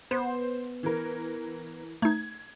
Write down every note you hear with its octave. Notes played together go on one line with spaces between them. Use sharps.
B3 C5
E3 A#4
A3 D#4 G#6